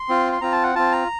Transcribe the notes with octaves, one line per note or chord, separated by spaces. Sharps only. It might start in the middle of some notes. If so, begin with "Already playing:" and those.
Already playing: C6
C4 F4
C6
C4 F4 A#5
A5
F#5
C4 F4 A5
A#5